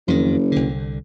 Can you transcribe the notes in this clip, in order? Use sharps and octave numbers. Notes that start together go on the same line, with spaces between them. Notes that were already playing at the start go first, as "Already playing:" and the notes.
F#1 F2 D#3
C2 D3